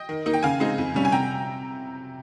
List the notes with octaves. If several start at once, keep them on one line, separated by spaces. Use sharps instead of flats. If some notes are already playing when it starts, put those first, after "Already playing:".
Already playing: D#5 G5
D#3
A#3 D#4
G5
C#3 F5 G#5
G#3 C4 D#4
F2
C3 G3 C#4
G#5
C3 G5 A#5